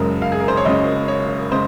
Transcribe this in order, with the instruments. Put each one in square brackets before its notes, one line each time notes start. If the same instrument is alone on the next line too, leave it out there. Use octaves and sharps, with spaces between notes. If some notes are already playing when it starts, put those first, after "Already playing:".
Already playing: [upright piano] F#1 F#2 C#3 G#3 A#4
F5
G#4
A#4
C5
C#5
F#1 F#2 C#3 G#3 D#5
C#5
C#3 G#3 C5